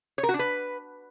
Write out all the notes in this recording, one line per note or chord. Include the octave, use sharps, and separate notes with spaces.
C#5
A#4
F#4
D4
B4